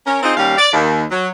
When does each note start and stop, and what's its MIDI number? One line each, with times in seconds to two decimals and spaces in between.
0.07 0.19 61
0.07 0.19 70
0.23 0.33 60
0.23 0.33 63
0.23 0.33 65
0.23 0.33 68
0.23 0.33 72
0.23 0.33 75
0.37 0.57 39
0.37 0.57 55
0.37 0.57 61
0.37 0.57 67
0.37 0.57 77
0.57 0.71 74
0.73 1.04 39
1.11 1.28 54